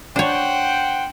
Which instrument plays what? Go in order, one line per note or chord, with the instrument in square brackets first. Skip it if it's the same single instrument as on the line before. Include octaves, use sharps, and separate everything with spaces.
[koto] D4 C#5 [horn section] C5 F#5 G5